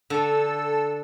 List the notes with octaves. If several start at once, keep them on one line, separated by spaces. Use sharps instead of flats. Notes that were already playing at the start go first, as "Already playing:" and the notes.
D3 A4 E6